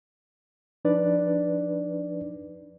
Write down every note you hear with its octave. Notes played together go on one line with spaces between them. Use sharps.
F3 D4 D#4 B4 D5